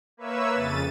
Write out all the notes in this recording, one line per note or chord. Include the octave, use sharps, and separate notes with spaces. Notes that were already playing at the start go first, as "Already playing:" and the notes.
A#3 B4 C#5 E5 E6
F2 C#3 A6 D#7